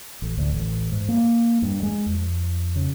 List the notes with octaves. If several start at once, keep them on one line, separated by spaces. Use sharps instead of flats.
A1
D2
A1
G#2
A#3
G2
G#3
F2
C#3